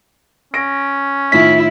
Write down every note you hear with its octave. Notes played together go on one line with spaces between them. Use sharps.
C#4 A#6 D7
A2 D#3 E4 F4 B6